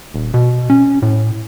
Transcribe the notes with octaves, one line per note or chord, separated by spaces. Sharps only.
D#1
B2
C#4
A2